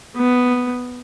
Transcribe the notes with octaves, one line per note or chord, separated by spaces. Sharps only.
B3